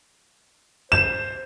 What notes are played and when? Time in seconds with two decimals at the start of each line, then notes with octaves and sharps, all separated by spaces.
0.92 C5 E7